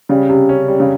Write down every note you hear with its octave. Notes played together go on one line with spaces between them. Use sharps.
C#3 G3
C3
C#4
G3
C#3